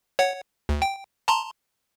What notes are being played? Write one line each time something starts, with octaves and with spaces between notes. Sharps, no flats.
C#5 F#5
D2
G5
A5 A#5 C6